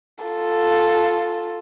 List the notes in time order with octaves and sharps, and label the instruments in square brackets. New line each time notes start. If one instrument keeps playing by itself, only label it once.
[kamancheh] F4 A4